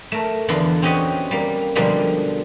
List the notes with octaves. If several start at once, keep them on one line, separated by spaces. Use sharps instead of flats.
A3 A#4
E2 D3 B3 F4 F5
C4 C#4 F#4 G4 D#5 F#5
G3 A#3
B2 D3 F3 G3 G#3 A#3